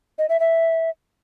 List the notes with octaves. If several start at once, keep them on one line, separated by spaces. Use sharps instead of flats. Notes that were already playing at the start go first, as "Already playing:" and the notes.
D#5
E5
E5